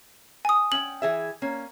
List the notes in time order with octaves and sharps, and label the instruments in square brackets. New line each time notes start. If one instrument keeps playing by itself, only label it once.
[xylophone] G#5 D#6
[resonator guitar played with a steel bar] C#4 G5 [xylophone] F#7
[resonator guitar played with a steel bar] E3 G#4 E5
A#3 C#4